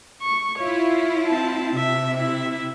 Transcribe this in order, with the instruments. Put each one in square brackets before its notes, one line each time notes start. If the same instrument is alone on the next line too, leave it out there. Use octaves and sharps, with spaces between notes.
[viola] C#6
[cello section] E4 F4 [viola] C#5
[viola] C4 A5
[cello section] C3 [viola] E5
[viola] E4 E5